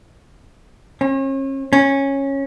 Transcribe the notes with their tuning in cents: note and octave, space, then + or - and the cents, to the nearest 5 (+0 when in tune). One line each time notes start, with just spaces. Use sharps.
C#4 -40
C#4 -10